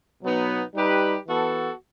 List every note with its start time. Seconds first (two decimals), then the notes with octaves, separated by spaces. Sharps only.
0.22 B2 F#3 B3 D#4
0.75 G3 D#4 G4 B4
1.27 E3 B3 F#4 A4